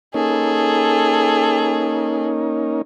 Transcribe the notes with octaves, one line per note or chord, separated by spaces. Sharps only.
A#3 C#4 D#4 G#4 A4